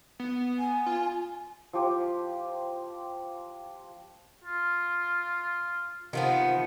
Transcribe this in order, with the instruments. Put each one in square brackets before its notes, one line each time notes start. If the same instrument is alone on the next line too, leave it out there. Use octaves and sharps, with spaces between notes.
[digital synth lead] B3
[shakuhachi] G#5
[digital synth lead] F4
[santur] F3 G4
[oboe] F4
[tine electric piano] C3 D#4 F4 [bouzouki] D#3 F3 B3